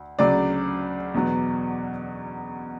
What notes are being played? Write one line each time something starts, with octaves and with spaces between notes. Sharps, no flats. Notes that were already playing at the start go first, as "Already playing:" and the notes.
Already playing: D2
D2 C#3 F#3 D5 D6
E2 B2 F#3 B3